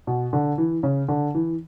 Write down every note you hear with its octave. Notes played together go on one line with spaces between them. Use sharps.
B2
D3
E3
C#3
D3
E3